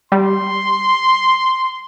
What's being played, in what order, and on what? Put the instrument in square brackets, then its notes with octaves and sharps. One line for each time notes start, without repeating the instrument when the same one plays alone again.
[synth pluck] G3 [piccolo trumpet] C6